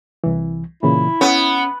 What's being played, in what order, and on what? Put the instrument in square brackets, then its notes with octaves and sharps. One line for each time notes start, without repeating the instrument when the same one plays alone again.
[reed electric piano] C2 E3
[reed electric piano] A#2 C#3 E3 [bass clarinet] E4
[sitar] B3 [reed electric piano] C#4